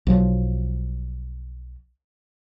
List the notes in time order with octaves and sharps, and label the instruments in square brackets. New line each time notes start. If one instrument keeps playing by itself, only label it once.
[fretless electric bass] B1 F3 F#3